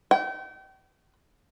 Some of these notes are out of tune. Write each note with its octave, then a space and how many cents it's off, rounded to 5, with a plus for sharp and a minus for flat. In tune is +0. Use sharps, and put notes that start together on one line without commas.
G5 -35